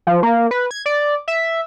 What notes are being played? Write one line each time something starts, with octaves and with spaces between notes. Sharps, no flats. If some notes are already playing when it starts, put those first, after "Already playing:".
F3
A#3
B4
G#6
D5
E5